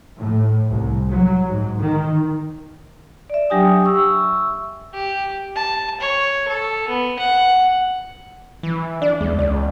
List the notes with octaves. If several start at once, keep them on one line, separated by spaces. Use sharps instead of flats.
A2
C2
F#3
G#2
D#3
D5 E5
F#3 D4 G4 G5 G#5 D#6
E5 C#6 E6
G4
A5
C#5
A4
B3
F#5
E3
D4 D5
E2 G#3
C#2 D5